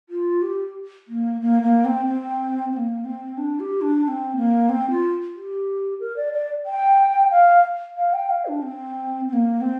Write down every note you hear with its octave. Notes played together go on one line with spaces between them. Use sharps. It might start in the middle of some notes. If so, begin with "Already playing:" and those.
F4
G4
A#3
A#3
A#3
C4
C4
C4
A#3
C4
D4
G4
D4
D4
C4
A#3
C4
F4
G4
A#4
D5
D5
G5
F5
F5
G5
F5
D4
C4
C4
A#3
C4